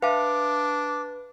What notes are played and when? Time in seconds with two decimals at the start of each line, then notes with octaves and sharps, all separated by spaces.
0.02 D4 B4 E5 F5 A5 D6